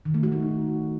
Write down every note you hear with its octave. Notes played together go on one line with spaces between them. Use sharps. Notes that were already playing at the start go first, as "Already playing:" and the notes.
D#3
A3
F#4
D#4